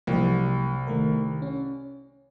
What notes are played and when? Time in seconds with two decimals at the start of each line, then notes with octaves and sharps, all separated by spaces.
0.07 C2 F3 F#3 A#3
0.87 D#3 A3 A#4
1.42 C#4